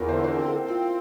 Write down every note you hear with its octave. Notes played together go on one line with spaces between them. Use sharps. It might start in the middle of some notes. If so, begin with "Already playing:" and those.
Already playing: E2 E4 F4 A#4
D3 C5
C5
A#4
C4
A4
C4
F4